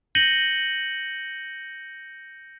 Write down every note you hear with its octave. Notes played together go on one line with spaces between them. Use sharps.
G6 A#6 C#7 D#7 F#7 G7